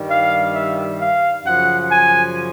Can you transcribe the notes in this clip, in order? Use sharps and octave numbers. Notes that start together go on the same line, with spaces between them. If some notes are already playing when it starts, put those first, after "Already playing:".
Already playing: G2 D#3 G3
F5
E5
F5
F#2 C#3 F3 F#5
G#5